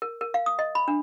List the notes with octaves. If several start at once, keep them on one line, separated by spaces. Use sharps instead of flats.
A#4
A#4
F5
D#6
D#5
B5
D4